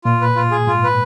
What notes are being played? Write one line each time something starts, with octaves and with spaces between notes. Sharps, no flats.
A#2 F4
B4
F4
G#4
G#2 F4
B4